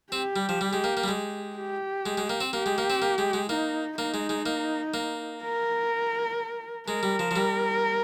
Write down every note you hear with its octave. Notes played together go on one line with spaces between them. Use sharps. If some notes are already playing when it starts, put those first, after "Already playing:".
C4 G4
G3
F3
G3
G#3
A#3
A#3
G3
G#3
G4
G#3
G#3
A#3
C4
A#3 G4
G#3
A#3
C4
A#3
G#3
G#3
A#3 D#4
A#3 D#4
G#3
G#3
A#3
A#3
A#4
G#3 A#4
G3
F3
F3
G3